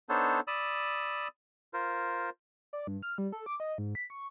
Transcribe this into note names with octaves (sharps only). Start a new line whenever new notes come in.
B3 D4 D#4 A4 C5 C#5
D5 B5 D#6 E6
F4 A#4 C5
D5
G2
F6
G3
A4
D6
D#5
G#2
B6
C#6